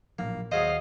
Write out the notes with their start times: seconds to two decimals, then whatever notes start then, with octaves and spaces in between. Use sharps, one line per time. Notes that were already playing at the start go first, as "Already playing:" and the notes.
0.19 A#1 A2 F#3 A#3
0.51 D#2 F#3 G#4 C5 D#5 F5